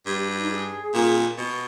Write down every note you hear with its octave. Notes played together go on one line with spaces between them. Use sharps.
G2 G4
G4
F#4
D#4
G#4
A#2
B2 F#4